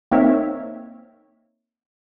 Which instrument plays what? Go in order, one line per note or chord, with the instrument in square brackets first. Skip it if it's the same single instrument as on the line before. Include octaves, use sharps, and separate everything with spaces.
[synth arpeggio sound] A#3 C4 D#4 A#4 C#5 E5